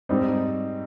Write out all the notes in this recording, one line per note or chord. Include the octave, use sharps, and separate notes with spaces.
G#2 G3 C4 D#4